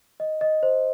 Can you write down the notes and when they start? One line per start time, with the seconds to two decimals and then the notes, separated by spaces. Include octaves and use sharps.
0.20 D#5
0.41 D#5
0.63 C5